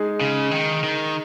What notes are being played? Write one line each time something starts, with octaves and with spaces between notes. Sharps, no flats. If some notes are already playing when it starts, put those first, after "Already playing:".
Already playing: G#3 D#4 G#4
C#3
D#3
D#3